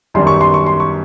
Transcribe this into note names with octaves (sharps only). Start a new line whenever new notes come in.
F#2 D#3 G3 B3 D4 C6
C#6
C6
C#6
C6
C#6